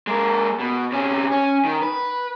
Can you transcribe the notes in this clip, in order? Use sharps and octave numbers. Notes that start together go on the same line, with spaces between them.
G#3 A#3
B2
C3 C#4
C#4
D#3
B4